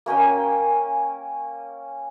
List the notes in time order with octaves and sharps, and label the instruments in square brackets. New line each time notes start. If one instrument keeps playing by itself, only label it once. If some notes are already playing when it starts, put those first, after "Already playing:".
[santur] A#3 C#4 G5 G#5